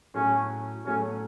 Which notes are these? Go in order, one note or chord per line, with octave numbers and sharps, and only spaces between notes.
A2 F#3 A3 C#4
A2 F#3 A3 C#4